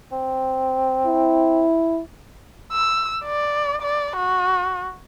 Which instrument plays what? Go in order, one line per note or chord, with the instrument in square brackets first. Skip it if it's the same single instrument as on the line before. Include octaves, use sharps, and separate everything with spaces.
[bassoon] C4
[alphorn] E4
[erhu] E6
D5
D5
F#4